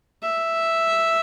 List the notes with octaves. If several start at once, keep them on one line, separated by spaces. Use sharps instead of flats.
E5